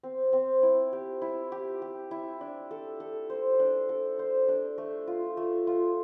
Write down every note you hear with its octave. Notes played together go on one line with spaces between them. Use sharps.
C4
C4
E4
G4
E4
G4
G4
E4
D4
A4
A4
C5
D4
A4
C5
D4
A3
F4
A3
F4